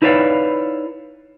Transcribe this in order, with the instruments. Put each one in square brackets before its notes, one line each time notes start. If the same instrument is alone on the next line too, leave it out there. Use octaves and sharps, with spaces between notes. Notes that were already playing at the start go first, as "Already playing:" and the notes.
[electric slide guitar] D#4 E4 B4 C#5 D5 F5